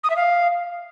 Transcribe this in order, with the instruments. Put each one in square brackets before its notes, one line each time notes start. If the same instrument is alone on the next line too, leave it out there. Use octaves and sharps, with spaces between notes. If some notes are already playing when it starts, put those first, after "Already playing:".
[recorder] D#6
E5
F5